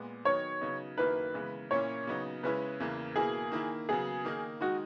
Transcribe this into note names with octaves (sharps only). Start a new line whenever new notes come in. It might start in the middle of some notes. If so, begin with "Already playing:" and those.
Already playing: A#2 G#3 B3
D#3 F#3 B3 D#4 C#5
C#3 F#3 B3 D#4
F#2 D#3 A#3 E4 B4
C#3 E3 G#3 B3
A#2 A#3 C#4 E4 C#5
C#3 F#3 B3 D#4
C#3 G#3 C#4 E4 B4
E2 C#3 E3 A#3
B2 A#3 E4 G#4
D#3 A#3 E4
C#3 F#3 B3 G#4
D#3 A#3 D#4
D#3 G#3 D#4 F#4